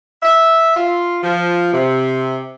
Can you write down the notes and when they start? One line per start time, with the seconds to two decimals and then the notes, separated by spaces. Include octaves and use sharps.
0.22 E5
0.75 F4
1.23 F3
1.72 C3